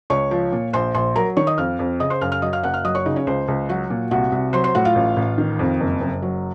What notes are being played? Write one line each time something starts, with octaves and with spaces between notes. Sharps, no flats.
C#2 C#5 C#6
F3
A#2
A#1 C5 C6
A#1 C5 C6
F#3 A#4 A#5
D#3 C#5 C#6
D#5 D#6
F2 F5 F6
F2
C#3 D#5 D#6
C5 C6
F#2 F5 F6
F5 F6
F#3 D#5 D#6
F5 F6
F#1 F#5 F#6
F5 F6
F#3 D#5 D#6
C#5 C#6
C#3 D#4 D#5
C#4 C#5
C#2 C5
C#2
F#3 F#4 F#5
A#2
C2 F#4 F#5
C2
F#3 C5 C6
C5 C6
A2 F#4 F#5
F4 F5
A1
A1
D#3
F2
F#1
F#1
F#3